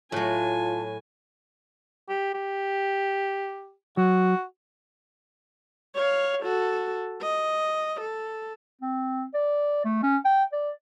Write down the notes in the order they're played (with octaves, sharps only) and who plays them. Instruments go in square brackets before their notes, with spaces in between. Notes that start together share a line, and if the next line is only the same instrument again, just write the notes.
[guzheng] A2 F#3 [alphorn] F4 [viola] G#5 [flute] A5
[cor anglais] G4
G4
[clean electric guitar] F#3 [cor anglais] F#4
[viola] C#5 F5
F#4 A4
D#5
A4
[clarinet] C4
D5
A3
C#4
G5
D5